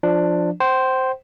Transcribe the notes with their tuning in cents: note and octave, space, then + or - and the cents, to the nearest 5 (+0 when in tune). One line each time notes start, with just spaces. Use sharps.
F3 +0 D4 +10
C5 +0 G5 -40